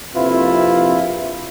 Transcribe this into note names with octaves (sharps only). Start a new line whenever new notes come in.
A#1 F2 C3 E4 F4 B4